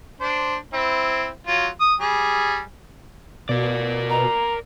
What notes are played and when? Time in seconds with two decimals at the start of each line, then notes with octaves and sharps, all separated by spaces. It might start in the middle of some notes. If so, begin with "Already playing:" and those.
0.20 D4 C5
0.73 C4 E4
1.47 F#3 F4
1.80 D#6
2.00 G3 G#4
3.49 B2 A#4 D5
4.10 A#5